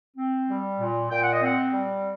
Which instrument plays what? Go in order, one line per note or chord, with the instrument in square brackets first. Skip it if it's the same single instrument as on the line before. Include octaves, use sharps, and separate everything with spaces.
[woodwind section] C4
G3
A#2
A#2 G5
F#5
D#5
C4 F#5
G3